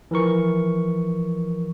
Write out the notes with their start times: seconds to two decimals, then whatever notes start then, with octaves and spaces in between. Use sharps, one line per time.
0.11 E3 F3 A#4 C#6